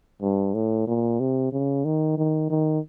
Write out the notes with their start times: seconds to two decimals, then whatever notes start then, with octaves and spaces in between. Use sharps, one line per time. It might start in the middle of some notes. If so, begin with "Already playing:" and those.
0.22 G2
0.54 A2
0.87 A#2
1.20 C3
1.52 C#3
1.85 D#3
2.17 D#3
2.50 D#3